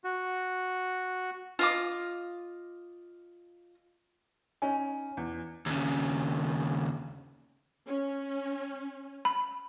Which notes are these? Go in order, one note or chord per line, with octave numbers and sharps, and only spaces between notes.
F#4
F4 D#5 D6
C#4 D#4 G#5
E2
D#2 C#3
C#4
B5